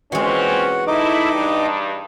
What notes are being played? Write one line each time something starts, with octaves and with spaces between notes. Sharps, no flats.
A#2 E3 G#3 C4 C#4 F#4 F#5
A3 D#4 E4 D#5 D6
G2